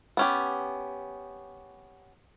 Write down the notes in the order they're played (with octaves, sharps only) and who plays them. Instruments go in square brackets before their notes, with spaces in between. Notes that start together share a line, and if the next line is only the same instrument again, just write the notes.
[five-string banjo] B3 C#4 G4